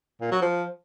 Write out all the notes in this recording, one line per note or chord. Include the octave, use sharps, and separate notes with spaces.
A#2
F#3
F3